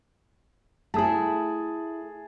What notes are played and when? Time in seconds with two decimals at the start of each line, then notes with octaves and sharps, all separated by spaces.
0.94 A3 E4 G#4 A5